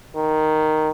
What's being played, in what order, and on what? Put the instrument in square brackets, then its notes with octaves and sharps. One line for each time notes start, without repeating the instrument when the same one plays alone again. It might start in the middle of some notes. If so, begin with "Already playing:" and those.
[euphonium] D#3